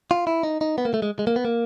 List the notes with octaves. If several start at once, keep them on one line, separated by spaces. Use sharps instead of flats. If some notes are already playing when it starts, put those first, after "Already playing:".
F4
E4
D#4
D#4
B3
A#3
A3
G#3
G#3
A#3
B3
A#3